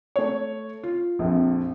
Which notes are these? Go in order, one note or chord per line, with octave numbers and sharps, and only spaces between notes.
A3 C#5
F4
A#1 F2